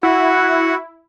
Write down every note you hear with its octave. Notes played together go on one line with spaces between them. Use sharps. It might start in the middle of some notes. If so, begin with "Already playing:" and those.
E4 F#4 F#5